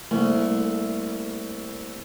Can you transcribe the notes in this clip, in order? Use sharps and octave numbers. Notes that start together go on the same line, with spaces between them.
C2 A3 A#3